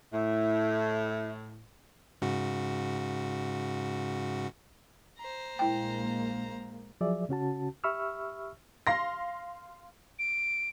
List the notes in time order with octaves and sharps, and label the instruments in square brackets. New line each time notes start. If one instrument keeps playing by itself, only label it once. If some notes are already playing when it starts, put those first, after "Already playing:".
[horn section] A2 [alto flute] E5
[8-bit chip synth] G#2 C#3 F#4
[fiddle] C5 A#5
[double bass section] A#1 G#3 A#3 [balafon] E4 G5
[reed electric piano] F3 F#3 G#4 D5 E5
C#3 C#4 F#4 A5
G4 E5 B5 C#6 E6 F6
[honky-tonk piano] F5 C6 A#6
[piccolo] D7